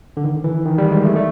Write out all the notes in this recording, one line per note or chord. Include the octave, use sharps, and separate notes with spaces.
D3
D#3
E3
D#3
G3
G#3
A3
A3